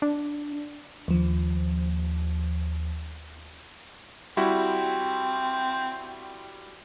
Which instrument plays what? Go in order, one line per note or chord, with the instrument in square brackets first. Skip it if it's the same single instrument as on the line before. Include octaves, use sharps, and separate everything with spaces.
[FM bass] D4
[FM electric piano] D#2 F3
[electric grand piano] G3 E4 F#4 [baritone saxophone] C4